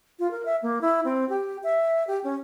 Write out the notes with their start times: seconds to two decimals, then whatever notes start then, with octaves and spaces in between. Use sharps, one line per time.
0.19 F4
0.31 A#4
0.45 E5
0.62 A#3
0.81 E4
1.05 C4
1.29 G4
1.63 E5
2.07 G4
2.24 C#4